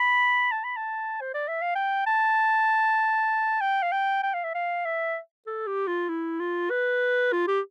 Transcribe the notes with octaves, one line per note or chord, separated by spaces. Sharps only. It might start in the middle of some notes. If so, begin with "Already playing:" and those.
Already playing: B5
A5
B5
A5
C5
D5
E5
F5
G5
A5
G5
F5
G5
G5
F5
E5
F5
E5
A4
G4
F4
E4
F4
B4
F4
G4